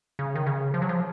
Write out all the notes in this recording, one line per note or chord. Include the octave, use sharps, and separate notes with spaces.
C#3
D#3
C#3
F3
F#3
F3